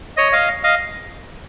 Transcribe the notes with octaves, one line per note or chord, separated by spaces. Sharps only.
C#5 D#5
D#5 F5
D#5 F5